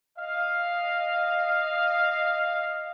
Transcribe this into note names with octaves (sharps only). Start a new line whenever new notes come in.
D#5 F5